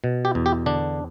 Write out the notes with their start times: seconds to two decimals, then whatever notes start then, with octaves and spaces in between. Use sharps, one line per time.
0.04 B2
0.25 G4
0.35 E2
0.46 G4
0.66 D3 D4